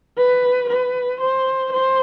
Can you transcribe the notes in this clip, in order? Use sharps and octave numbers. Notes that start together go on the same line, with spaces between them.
B4
B4
C5
C5